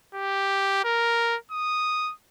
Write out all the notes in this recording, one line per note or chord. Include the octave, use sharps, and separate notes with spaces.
G4
A#4
D#6